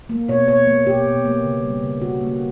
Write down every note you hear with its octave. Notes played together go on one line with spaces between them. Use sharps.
A#3
B2 C#5
B2 C#5
A#3
B2 G4
B2
A#3
C#3
G3
C#3
C#3 F#4
A#3